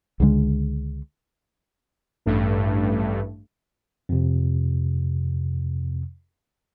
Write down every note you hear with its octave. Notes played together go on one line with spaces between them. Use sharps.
C#2 D3 F#3 G#3
A1 G2 A3
F2 C3